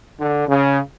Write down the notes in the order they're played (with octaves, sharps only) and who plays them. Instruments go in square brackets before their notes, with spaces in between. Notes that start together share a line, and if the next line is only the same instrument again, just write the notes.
[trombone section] D3
C#3